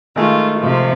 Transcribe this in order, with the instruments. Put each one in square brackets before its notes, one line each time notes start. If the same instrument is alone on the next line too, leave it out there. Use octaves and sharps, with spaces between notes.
[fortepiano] D#3 G#3 A3 [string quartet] F4
[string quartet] C3 F3